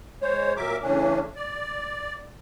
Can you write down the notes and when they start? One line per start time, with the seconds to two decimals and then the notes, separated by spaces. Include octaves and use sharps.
0.22 G#3 C5 C#5
0.57 A#2 F#3 A#4 E5 D6
0.82 C#3 E3 A3 C#4 D4
1.36 D5